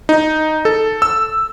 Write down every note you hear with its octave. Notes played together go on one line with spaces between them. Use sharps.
D#4
A4
E6